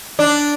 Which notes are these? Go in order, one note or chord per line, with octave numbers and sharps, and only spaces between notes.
D4